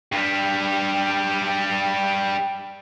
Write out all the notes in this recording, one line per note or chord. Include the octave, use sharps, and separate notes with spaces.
G2 G3